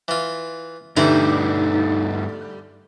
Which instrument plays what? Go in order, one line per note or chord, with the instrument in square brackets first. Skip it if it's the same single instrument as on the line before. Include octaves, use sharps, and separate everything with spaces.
[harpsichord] E3 F4
[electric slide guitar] G2 A3 [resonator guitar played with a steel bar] D3 G3 [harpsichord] E3 E4 A#5 [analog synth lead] D#4